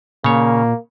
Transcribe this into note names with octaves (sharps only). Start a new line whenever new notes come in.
A#2 C#3 A#3 C#5